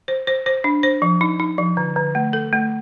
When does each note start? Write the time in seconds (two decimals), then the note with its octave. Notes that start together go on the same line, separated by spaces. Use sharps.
0.08 C5
0.27 C5
0.46 C5
0.64 D4
0.83 C5
1.02 F3
1.21 D#4
1.40 D#4
1.58 F3
1.77 D3
1.96 D3
2.15 A3
2.33 A4
2.53 A3